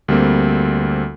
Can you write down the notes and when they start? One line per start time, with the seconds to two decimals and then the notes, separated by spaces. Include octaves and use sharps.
0.08 D2 G3 A#3 C4